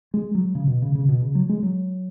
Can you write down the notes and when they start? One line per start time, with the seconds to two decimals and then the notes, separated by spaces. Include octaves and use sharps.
0.14 G#3
0.35 F#3
0.55 C#3
0.67 B2
0.82 C#3
0.95 C#3
1.09 B2
1.22 C#3
1.35 F#3
1.49 G#3
1.63 F#3